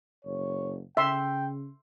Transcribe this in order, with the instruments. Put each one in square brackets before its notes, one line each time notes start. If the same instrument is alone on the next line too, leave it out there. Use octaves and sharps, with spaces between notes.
[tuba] F#1 [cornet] C#5
[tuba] C#3 [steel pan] E5 C6 [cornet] G5